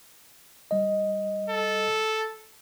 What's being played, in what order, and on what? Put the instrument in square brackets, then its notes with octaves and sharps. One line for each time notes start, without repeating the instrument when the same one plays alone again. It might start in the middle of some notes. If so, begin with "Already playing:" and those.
[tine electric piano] G3 D#5
[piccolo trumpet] A4